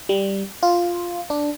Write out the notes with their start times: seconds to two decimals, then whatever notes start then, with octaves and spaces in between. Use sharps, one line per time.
0.09 G3
0.63 F4
1.30 D4